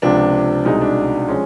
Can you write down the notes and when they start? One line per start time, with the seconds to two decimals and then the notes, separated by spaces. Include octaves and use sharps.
0.02 C#2 C3 F3 D4
0.65 C2 B2 G#3 D#4
0.81 D4
1.28 F3 G#3 C#4